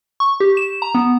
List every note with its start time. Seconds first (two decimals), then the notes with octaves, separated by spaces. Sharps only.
0.20 C#6
0.40 G4
0.57 E7
0.82 A#5
0.95 B3